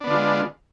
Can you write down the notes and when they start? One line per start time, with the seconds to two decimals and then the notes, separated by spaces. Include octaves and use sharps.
0.01 D4
0.04 B3
0.07 D3
0.10 F4
0.14 G#3